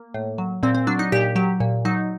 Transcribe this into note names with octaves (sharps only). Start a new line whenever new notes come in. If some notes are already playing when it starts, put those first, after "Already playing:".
Already playing: A#3
A2
F#3
A#2 C4
C4
F#3 D4
D#4
A#2 G4
F#3 G4
A#2
F#3 D#4